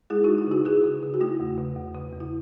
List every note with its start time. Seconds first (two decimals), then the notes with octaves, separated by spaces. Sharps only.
0.10 G#3 E4 G#4
0.24 G#3 D#4 F#4
0.38 E4
0.47 C#3 D#4 F#4
0.65 C#3 E4 G#4
0.84 C#3
1.03 C#3
1.14 F#4
1.21 A3 E4
1.40 E2
1.58 C#3
1.76 E2
1.94 C#3
2.13 E2
2.20 E4